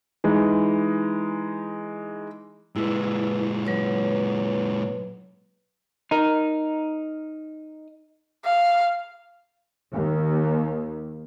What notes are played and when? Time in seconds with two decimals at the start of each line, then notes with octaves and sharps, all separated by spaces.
0.24 E3 G#3 D#4
2.76 A#2 G#3 E4 B4
3.65 F#3 B4 C#5
6.11 D#4 A#4
8.45 F5
9.93 D#2